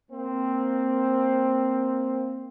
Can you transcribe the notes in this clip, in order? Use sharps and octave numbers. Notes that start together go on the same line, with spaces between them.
A#3 C4